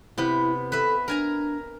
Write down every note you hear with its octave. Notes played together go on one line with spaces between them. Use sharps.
C3 B3 E4
A4 B4 E5
D4 A#4 G#5 A#5